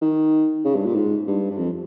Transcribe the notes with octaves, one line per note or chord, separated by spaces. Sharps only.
D#3
C#3
G2
A#2
G#2
G2
G2
F2